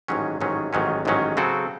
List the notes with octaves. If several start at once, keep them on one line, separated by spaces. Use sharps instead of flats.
A1 G#2 D#3 F#3 C#4
A1 G#2 D#3 F#3 C#4
A1 G#2 D#3 F#3 C#4
A1 G#2 D#3 F#3 C#4
C#3 F#3 C4 F#4 A4